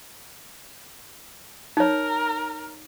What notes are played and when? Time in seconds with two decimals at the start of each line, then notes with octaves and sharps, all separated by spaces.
1.77 D#4 A#4 C#5